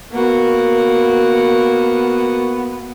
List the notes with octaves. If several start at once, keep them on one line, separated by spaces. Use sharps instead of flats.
A#3 B3 F#4